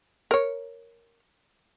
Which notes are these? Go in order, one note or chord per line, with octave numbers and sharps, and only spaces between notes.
A#4 C#5